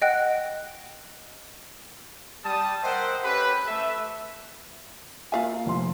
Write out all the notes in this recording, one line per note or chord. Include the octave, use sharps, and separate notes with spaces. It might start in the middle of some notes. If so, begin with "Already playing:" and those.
D#5 F#5 G5 F#6
G3 A5 D#6
A#4 C5 D#5 E5 F#5 G5
C#4 G4 A4 B4
A3 A4 B4 E5
A#3 F4 E5 F5 G#5
F1 C6